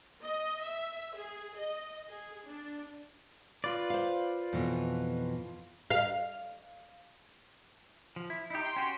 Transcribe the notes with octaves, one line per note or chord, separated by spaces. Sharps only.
D#5
E5
G#4
D#5
G#4
D4
F4 B4 D5
C5 F5
F2 B2 E3
F5
F3
E4
D#4 E4 G4
G5 C6
C#4 F#4 G4